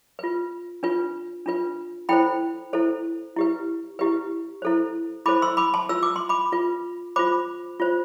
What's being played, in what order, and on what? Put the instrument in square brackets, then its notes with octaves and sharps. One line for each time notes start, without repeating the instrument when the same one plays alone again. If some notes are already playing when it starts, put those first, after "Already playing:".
[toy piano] F4 B4
D4 F4 B4
D4 F4 B4
E4 A4 C5 G5 B5
E4 A4 C5
E4 G4 B4
E4 G4 B4
E4 A4 C5
E4 A4 C5 B5 D6
C6 E6
B5 D6
A5 C6
F4 B4 E6
D6
C6
B5 D6
F4 B4
F4 C5 B5 D6
F4 C5